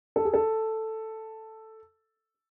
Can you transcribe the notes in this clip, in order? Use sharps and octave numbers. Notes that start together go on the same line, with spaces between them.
A4
G#4
A4